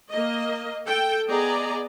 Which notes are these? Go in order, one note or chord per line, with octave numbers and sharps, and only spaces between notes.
A#3 D#5
A4 G5
B3 G#4 D5 D#5 A#5